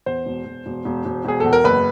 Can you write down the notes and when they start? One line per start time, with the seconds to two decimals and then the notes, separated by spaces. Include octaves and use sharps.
0.06 E2 C5
0.26 E1
0.46 E1
0.66 E1
0.85 E1
1.05 E1
1.25 E1 G#4
1.40 E2 A4
1.53 A#4
1.64 F#1 B4